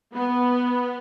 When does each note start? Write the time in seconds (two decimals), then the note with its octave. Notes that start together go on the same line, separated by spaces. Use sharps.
0.14 B3